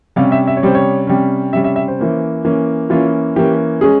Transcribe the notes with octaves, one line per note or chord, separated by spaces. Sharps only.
C3 G3 C#4 F5
E5
E5
C#5
C3 G3 C#4 C5
C#5
C3 G3 C#4
C3 G3 C#4 E5
E5
E5
C5
E3 A#3 C#4
E3 A#3 C#4
E3 A#3 C#4 F4
E3 A#3 C#4 G4
G#3 C#4 G#4